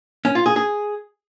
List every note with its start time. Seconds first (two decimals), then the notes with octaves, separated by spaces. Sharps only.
0.25 C#4
0.35 F4
0.46 G#4
0.56 G#4